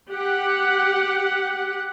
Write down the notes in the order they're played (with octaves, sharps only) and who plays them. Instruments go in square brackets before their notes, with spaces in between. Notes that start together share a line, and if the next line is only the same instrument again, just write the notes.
[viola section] G4 F#5